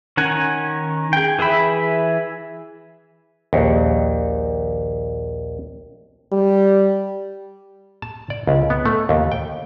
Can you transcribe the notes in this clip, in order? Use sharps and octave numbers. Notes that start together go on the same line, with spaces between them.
D#3 C#4 F#5 G#5
G#4 G5
E3 G#4 E5 B5
A#1 D#2
G3
A5
D5
C#2
B3
A3
D#2
G5